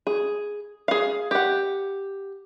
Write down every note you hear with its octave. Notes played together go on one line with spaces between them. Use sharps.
G#4
G#4 F5
G4 F#5